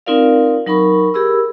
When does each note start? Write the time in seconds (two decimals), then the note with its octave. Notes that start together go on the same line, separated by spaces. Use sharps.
0.06 C4 D#4 F4 A#4 D5 F5
0.66 F#3 D#4 A#4 B5 C#6
1.14 G4 G#4 A#4 B5 E6